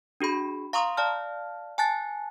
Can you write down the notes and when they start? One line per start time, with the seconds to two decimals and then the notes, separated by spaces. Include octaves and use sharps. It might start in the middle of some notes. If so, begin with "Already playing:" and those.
0.21 D4 F#4 G#4 B5
0.73 F5 A#5 C6 C#6 D#6
0.97 D5 F5 A5 F6
1.78 G#5 A5 F#6 A6